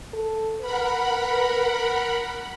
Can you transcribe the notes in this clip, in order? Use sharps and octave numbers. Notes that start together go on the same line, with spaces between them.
A4
A#4 B4 F#5 B5